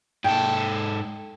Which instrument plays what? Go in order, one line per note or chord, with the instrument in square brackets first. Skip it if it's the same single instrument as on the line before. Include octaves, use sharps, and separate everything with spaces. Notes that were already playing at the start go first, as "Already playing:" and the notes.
[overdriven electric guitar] G#2 A4 [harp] G5